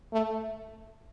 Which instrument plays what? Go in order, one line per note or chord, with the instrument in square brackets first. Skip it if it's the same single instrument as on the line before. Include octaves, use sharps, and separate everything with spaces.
[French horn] A3